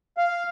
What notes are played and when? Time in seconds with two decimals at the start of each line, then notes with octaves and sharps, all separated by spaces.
0.17 F5